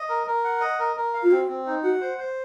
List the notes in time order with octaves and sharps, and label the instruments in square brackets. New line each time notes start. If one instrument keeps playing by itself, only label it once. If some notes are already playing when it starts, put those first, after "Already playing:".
Already playing: [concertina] D#5
A#4
A#4
F#5
D#5
A#4
A#4
F5
[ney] F4
[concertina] C4 [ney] F#4
[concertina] C4
D#4
[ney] F#4 [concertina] F#5
[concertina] C5
C5